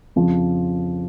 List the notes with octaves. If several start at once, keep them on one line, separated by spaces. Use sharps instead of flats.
F2 C#3 F3